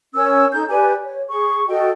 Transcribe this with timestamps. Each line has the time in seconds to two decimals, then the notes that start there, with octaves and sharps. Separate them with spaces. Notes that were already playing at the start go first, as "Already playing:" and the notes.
0.14 C#4 A#4 C#5 E6
0.52 D#4 A4 G6
0.69 G4 B4 D5 G#5
1.02 C#5
1.29 G#4 C#6
1.68 F#4 A4 D#5 G5